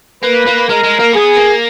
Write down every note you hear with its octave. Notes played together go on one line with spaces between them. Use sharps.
A#3 B4
A#3
G#3 A#4
G#3
A#3
B3 G#4
A#3